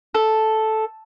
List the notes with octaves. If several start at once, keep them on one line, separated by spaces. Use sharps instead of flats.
A4